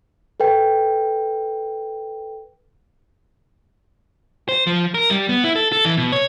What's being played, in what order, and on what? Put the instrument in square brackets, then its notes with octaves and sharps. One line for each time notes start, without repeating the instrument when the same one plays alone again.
[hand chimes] A4 B4 G5
[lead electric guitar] C5
F3
A#4
G3
B3
E4
A4
A4
E3
B2
C#5